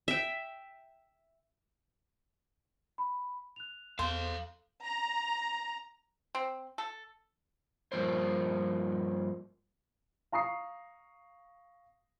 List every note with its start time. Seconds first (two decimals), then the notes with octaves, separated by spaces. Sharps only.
0.08 E5 G5
2.98 B5
3.56 F#6 F7
3.99 E2 A4 C5 F5
4.84 A#5
6.35 C4
6.78 A4
7.92 G2 D#3 F3 A#3 C5
10.32 F5 A#5 C#6 D#6 C7